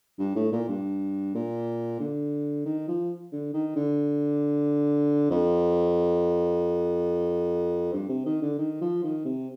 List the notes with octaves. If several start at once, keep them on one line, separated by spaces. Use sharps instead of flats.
G2
A2
A#2
G2
A#2
D3
D#3
F3
D3
D#3
D3
F2
G2
C3
D#3
D3
D#3
F3
D#3
C3